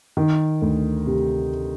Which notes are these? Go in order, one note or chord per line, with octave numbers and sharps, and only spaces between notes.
D#3
D2
C3